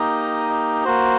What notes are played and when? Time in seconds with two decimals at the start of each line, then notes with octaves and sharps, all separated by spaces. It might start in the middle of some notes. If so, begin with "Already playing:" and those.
Already playing: A#3 D#4 G4 D#5
0.85 A#3 F#4 C5